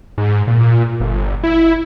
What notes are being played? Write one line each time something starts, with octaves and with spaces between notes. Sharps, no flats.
G#2
A#2
G1
E4